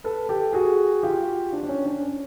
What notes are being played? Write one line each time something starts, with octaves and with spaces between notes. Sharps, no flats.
A4 B4
G4 A4
F#4 G#4
F4 G4
D4
D4
C#4
D4
C#4